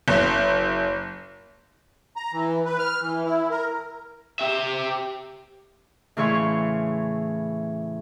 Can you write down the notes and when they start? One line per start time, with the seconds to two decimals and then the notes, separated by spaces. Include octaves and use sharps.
0.08 F#1
2.16 A#5
2.33 E3
2.65 B4
2.79 F6
3.02 E3
3.25 E4
3.50 A#4
4.39 G4 E5
6.17 A2 C#3 E3 C#5 C6